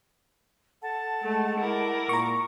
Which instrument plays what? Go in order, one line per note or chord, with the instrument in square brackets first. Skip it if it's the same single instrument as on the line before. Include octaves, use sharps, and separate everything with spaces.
[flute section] A4 F#5 A5
[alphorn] G#3 [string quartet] A3
[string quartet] E4 A#4 D6
[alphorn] A#2 [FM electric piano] A#5 C#6